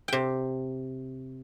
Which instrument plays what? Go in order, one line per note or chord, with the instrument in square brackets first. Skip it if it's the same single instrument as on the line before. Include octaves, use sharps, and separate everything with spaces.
[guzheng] C3 G5